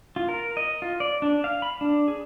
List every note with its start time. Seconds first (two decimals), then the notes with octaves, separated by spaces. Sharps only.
0.16 F4
0.29 A#4
0.57 D#5
0.82 F4
1.00 D5
1.22 D4
1.44 F5
1.62 B5
1.81 D4
2.08 G#4